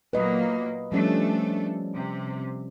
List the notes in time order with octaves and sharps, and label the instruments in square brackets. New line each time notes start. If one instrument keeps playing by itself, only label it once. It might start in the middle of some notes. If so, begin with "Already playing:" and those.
[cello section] A#2 F#3 A#3 [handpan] B4 D#5
[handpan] F3 G3 C#4 [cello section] A3 D4 A4
[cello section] C3